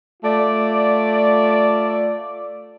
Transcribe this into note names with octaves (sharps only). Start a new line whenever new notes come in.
A3 F4 D5